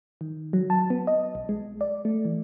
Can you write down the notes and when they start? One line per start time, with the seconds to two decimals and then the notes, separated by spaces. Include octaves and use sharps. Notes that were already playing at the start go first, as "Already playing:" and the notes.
0.21 D#3
0.53 F#3
0.70 A5
0.90 B3
1.07 D#5
1.35 B1
1.49 G#3
1.81 D5
2.05 A3
2.25 E3